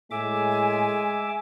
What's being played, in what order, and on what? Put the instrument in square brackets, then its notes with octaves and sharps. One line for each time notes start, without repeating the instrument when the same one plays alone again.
[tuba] A2 [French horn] G#3 [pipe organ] E5 D6 [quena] G#5